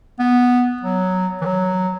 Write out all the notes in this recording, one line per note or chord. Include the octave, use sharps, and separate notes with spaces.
B3
F#3
E3
F#3